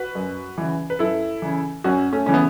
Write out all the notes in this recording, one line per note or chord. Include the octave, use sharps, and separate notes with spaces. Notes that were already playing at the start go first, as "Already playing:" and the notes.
Already playing: F#4 B4
F#2
C#3 E3
B4
F#2 E4 A4
C#3 E3
F#2 C#4 F#4
A3 C#4
C#3 E3 C#4
B3